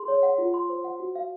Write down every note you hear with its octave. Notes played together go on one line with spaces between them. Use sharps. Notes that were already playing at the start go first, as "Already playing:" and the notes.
Already playing: G#4 C6
C#5
F#5
F4
C6
C5
F#5
F#4
F5